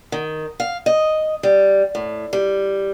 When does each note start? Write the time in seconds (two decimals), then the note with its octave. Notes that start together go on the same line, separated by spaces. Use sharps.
0.12 D#3
0.60 F5
0.86 D#5
1.43 G3
1.95 A2
2.33 G3